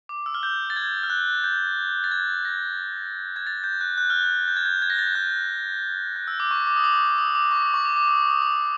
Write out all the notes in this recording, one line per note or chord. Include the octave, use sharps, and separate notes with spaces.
D6
E6
F6
G6
A6
G#6
F6
F#6
G6
A6
G#6
A#6
G#6
A6
G6
F#6
F#6
F6
F#6
G6
G#6
G6
G#6
A#6
A6
G#6
F#6
F#6
E6
D6
C#6
D6
D#6
D6
D#6
D6
C#6
D6
C#6
D6
D6
D#6
D#6
D6